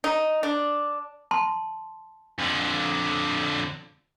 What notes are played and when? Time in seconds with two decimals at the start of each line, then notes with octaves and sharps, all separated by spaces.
0.04 D#4
0.43 D4
1.31 A5 C6
2.39 F2 D3